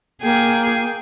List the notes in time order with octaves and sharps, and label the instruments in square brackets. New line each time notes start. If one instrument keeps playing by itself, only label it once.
[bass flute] A#3 [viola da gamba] G#4 [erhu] G5